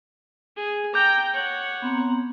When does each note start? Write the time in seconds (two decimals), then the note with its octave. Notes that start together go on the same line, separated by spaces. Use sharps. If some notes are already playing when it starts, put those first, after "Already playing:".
0.57 G#4
0.94 G5 A#5 D6 G6
1.33 C#5 F#5
1.82 B3 C4 A#5